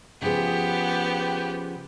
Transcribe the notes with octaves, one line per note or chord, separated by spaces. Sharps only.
C#3 F3 B3 G4 G#4